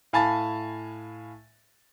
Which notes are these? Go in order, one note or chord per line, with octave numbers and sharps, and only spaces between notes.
A2 F5 G#5 A5 B5 A6